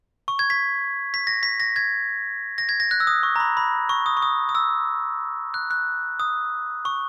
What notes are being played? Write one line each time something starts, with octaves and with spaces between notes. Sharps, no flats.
C#6
G#6
B6
B6
A#6
B6
A#6
G#6
A#6
G#6
A#6
F#6
E6
D#6
C#6
A#5
B5
B5
C#6
D#6
C#6
D#6
D#6
E6
F#6
F#6
D#6
C#6